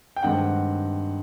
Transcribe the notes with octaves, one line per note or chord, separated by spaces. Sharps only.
G5
G2 D#3 G#3 C4 F#5